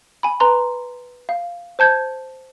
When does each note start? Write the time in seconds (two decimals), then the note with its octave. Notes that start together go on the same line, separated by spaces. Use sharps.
0.23 G#5 B5
0.40 B4 A#5 C6
1.29 F5
1.79 C5 A5 G6 G#6